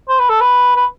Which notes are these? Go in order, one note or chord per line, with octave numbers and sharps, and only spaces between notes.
C5
B4
A4
B4
B4